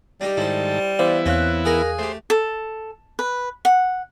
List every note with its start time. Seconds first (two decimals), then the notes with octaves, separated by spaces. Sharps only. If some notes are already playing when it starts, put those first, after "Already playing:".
0.21 G3 D4 D#4 G4
0.37 G#2 D#3 E4 A4 C5
0.99 E3 B3 E4 C5 D5 F5
1.26 E2 C4 C#4 F5 F#6
1.65 D#4 G#4 A#4 F#5
1.98 A3 G4 C5
2.30 A4
3.19 B4
3.65 F#5